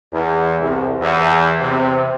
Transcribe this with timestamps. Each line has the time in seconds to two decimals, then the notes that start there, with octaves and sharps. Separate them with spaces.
0.12 E2
0.60 C2
1.01 E2
1.60 C3